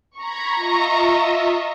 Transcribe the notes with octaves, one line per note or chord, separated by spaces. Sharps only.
A#5 B5 C#6 G#6 B6
F4 D#5 E5